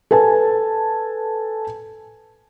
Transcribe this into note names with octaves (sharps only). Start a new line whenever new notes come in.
A4 B4 G#5 A5